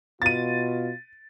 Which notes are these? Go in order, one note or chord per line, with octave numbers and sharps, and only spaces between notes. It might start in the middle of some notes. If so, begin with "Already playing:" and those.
B2 F4 A6 D#7